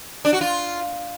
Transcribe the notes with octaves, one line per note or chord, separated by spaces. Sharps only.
D4
F#4
F4